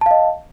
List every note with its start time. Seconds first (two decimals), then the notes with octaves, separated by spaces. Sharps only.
0.01 A5
0.06 F5
0.11 D#5